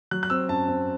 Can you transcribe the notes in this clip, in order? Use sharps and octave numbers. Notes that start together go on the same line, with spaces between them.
F#3 F#6
F#6
C4 E6
F#2 A5
C4